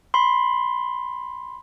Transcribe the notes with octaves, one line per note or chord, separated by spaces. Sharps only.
B5 C6